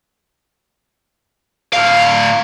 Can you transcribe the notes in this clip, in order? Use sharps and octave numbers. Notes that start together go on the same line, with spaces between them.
A2 F5